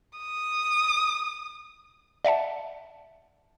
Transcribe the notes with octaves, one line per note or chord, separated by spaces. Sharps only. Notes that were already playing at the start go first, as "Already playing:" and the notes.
D#6
D5 E5 F#5 A5